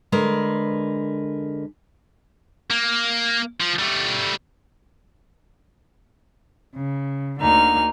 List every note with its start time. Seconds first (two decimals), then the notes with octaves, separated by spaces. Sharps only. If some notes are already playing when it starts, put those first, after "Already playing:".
0.12 D3 G#3 A#4 B4
2.71 A#3
3.61 F3
3.79 G3 A3
6.73 C#3
7.39 D2 D3 A#3 D#4 F6